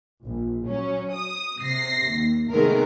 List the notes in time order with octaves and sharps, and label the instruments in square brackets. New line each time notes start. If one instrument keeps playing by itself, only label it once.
[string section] A#1
F#3 C#4
D#6
C3 A#6 C7
D#2
C3 D#3 G#3 A3 B3 A#4